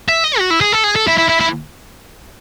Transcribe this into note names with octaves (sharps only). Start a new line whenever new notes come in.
E5
D#5
F#4
E4
G#4
A4
G#4
A4
E4
E4
E4
E4